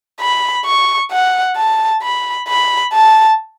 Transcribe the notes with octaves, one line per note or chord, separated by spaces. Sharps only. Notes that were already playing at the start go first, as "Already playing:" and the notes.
B5
C#6
F#5
A5
B5
B5
A5